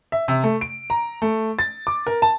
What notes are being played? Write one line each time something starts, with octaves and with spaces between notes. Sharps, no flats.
E5
C3
A3
D7
A#5
A3
A6
D6
A#4
A5